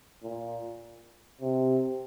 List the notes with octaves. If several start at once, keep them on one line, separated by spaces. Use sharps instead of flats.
A#2
C3